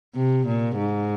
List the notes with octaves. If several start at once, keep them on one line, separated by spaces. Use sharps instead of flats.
C3
A#2
G#2